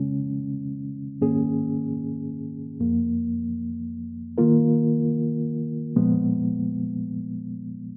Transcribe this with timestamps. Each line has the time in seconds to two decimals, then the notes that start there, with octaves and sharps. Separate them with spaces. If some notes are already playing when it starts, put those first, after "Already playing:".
Already playing: C#3 G#3 C#4
1.21 G#2 D#3 A#3 C#4 G#4
2.80 F2 F3 A#3
4.38 D#3 A#3 F4 A#4
5.96 A#2 F3 G#3 B3